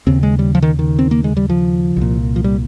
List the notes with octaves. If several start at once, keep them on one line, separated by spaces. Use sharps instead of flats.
D#2 C#3 C4
G#3
G3
F3
D#3
D#3
C4
A#3
G#3
G3
F3
C2 A#2
F3
G3